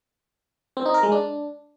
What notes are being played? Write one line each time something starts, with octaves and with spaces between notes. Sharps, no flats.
C4
D#4
A#4
G#3
D4